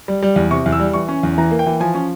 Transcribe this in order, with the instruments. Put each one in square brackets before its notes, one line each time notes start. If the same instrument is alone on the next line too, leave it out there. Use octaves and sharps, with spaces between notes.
[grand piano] G3
G3
E2
C3 C#6
E2
E6
G3
E3 C#6
C#4
E2
E3 A#5
A#3
G5
E3
F3 G#5
C#4